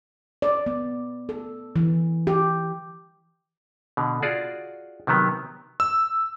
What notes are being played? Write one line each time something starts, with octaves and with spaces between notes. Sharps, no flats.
D5
B3
A4
E3
G4
B2 D3
F4 F#4 G#4 D5
C3 D#3 F#3 B3
E6